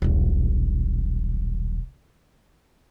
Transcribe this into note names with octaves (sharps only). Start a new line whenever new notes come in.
D#1 B1